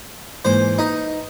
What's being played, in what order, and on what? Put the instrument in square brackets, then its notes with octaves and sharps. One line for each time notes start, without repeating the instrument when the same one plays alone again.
[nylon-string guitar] G#2 E3 A#3 [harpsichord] C5
[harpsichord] D#4 [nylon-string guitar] B4